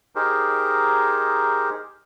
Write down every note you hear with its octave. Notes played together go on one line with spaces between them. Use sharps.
D#4 G4 G#4 A#4 C5